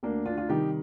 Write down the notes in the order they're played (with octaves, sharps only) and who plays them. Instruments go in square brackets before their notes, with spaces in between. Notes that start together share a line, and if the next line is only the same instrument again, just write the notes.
[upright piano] D2 A#3 D4
D4 F4
F4
C3 D#3 G3 D#4 G4